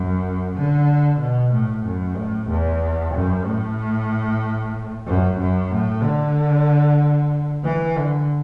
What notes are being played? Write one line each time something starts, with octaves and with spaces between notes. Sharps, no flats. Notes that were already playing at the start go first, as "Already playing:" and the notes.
Already playing: F#2
D3
B2
A2
F#2
A2
E2
F#2
A2
F#2
F#2
A2
D3
E3
D3